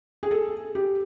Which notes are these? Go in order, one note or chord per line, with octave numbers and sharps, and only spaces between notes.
G#4
A4
G4